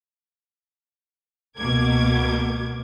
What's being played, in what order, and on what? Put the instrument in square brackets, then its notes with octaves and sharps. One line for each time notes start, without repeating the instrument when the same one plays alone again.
[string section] C#2 B2 A#3 D6 G#6